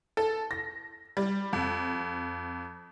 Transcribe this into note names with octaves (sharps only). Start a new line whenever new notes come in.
A4
A#6
G3
F2